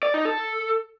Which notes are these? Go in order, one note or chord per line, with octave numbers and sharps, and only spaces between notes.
D5
D#4
A4